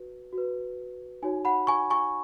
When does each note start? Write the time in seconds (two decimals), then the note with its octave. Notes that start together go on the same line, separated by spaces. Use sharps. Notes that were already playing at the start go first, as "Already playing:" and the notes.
Already playing: F#4 B4
0.33 F#4
0.38 B4
1.22 D#4 F#4 C#5 G#5
1.45 F#5 B5
1.67 G#5 C#6
1.90 G#5 C#6